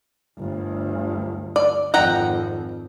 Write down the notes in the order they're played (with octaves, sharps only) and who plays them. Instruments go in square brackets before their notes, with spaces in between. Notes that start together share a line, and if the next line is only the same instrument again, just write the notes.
[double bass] G1 D2
[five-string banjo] D5
[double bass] G#1 F2 [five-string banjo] F#5 G5 A#5